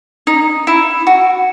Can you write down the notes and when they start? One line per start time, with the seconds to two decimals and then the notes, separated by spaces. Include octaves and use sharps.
0.27 D#4
0.67 E4
1.07 F#4